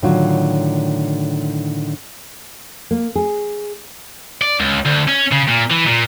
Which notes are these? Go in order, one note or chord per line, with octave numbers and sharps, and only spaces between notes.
A2 D3 D#3 F#3 F4 F#4
A#3
G#4
D5
C#2
D2
C#4
C#3
A#2
E3
A#2